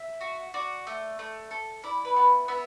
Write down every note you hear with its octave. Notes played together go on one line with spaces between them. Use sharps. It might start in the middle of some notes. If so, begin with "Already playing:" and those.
Already playing: E5
F#4
F#4 D5
A3
A3
A4
E4 D5
B4
B3
B3 E5